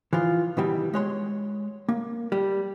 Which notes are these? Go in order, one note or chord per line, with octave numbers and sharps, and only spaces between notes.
E3 F3 F4
B2 D#3 E3 G3
G#3 C#5 C6
A#3
G3